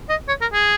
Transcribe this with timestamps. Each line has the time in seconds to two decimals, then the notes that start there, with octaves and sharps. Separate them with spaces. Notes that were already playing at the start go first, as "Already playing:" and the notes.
0.10 D#5
0.28 C#5
0.41 A#4
0.53 G#4